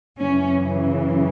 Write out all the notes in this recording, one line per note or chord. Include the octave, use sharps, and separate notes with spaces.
F#2 C#3 E3 C#4